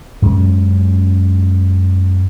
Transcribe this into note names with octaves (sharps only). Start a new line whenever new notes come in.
F#2 G#3 C#4